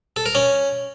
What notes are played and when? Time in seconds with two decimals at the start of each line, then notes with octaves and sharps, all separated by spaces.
0.16 A4
0.26 A#4
0.35 C#4